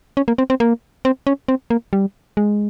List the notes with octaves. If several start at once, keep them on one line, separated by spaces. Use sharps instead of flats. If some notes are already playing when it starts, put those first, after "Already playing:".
C#4
A#3
C4
C4
A#3
C4
C#4
C4
A#3
G3
G#3